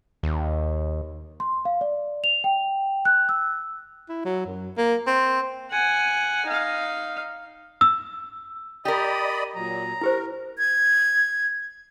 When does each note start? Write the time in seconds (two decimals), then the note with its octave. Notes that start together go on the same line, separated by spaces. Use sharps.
0.23 D#2
1.40 C6
1.65 F5
1.81 D5
2.24 F7
2.44 G5
3.05 F#6
3.29 E6
4.09 E4
4.25 F#3
4.46 F#2
4.77 A#3
5.07 C4
5.71 F#5 G#5
6.46 D#4 F5
7.81 E6
8.85 G4 A#4 D5 D#5 B5 D#6
9.56 A#2 F#3 A#5
10.01 E4 G4 A#4 C5
10.58 G#6